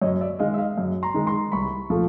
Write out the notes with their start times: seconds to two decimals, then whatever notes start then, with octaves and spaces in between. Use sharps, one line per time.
0.02 F#2 C#5 D#5
0.21 D5 E5
0.39 D#3 G#3 D#5 F5
0.54 E5
0.58 D#5 F5
0.78 F#2
1.03 A#5 C6
1.14 D#3 G#3
1.27 A#5 C6
1.52 C2 B5 C#6
1.90 A#2 F3 A3